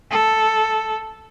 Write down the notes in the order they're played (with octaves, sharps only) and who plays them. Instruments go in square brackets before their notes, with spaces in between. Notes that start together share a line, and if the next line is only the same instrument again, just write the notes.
[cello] A4